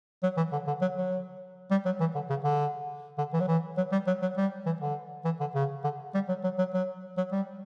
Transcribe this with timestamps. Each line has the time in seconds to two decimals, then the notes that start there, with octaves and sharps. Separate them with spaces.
0.23 F#3
0.37 E3
0.52 D3
0.67 D3
0.82 F#3
0.97 F#3
1.71 G3
1.85 F#3
2.00 E3
2.15 D3
2.30 C#3
2.44 D3
3.18 D3
3.33 E3
3.40 F#3
3.48 E3
3.77 F#3
3.92 G3
4.07 F#3
4.22 F#3
4.37 G3
4.66 E3
4.81 D3
5.25 E3
5.41 D3
5.55 C#3
5.84 D3
6.14 G3
6.29 F#3
6.44 F#3
6.59 F#3
6.74 F#3
7.18 F#3
7.32 G3